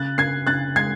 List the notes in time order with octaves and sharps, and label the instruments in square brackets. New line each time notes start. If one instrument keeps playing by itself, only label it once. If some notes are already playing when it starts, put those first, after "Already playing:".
Already playing: [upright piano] C#3 F#6 A6
C#3 G#6 C7
C#3 F#6 A6
G#3 G#6 C7